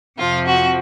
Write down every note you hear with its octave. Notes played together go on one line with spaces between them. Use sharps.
F2 C3 F3 F4
F#4